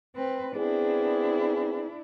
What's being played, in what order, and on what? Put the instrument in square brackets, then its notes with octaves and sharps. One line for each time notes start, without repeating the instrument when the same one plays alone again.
[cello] C4 B4
[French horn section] B3 C4 G#4 [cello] D4 E4